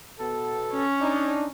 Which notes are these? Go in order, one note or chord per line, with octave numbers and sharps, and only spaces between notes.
B2 B3 A4
C#4
D4 D#4